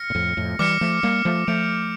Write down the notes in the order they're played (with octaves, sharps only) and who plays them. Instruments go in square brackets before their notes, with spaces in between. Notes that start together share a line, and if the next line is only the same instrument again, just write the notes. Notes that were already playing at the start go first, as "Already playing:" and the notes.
Already playing: [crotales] F6 A#6 C#7
[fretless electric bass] A#2
F2 A2
F2 A2
[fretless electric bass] E3 G3 [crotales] D6 F6 C#7
[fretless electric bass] F3 A3
G3 A#3
F3 A3
[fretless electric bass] F3 A3 [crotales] G6 D7 F7